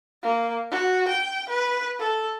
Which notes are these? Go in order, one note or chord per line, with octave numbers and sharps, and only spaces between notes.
A#3
F#4
G5
B4
A4